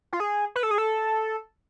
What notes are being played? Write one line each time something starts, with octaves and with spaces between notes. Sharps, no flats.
F4
G#4
B4
A4
G#4
A4